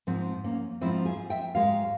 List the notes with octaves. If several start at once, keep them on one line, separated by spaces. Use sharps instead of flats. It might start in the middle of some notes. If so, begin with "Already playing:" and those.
G#2 F3 G#3 C4
A#3 C#4
G#2 F3 G#3 C4 E4
F4 G#4
E5 G5
G#2 F3 G#3 C#5 F5